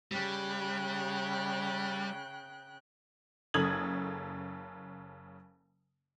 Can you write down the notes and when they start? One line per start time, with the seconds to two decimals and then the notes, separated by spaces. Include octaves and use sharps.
0.12 C#3 G3 G5 F#6
3.54 F#1 C#3 A4 D#6 G#6 F#7